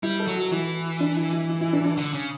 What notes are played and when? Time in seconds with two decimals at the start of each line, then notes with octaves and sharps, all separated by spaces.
0.03 G3 E4
0.20 A4
0.27 F#3
0.36 F#4
0.52 E3 E4
1.00 D4
1.16 E4
1.33 E4
1.49 E4
1.61 E4
1.73 D4
1.85 D4
1.97 D3
2.13 C#3